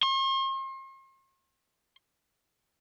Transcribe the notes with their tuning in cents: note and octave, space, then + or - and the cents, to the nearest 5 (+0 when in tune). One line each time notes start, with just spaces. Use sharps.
C6 +45